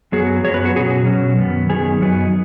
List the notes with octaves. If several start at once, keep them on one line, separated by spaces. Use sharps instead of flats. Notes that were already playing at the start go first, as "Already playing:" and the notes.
F#2 F#3 B3 G#4
F#2 F#3 B3 C#5
B4
F#4
B2 F#3 C#4 G#4
B2 F#3 C#4
F#2 D#3 B3
F#2 D#3 B3 G#4
F#2 F#3 B3 D#4